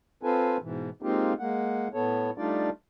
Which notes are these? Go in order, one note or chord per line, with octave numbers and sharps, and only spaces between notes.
C4 F4 A4 B4 G#5
G#2 B2 E3
G#3 A#3 C4 D#4 F4 G4
G#3 A#3 F#5
A2 B3 A4 C#5
G3 A3 D4 D#4 F4 D5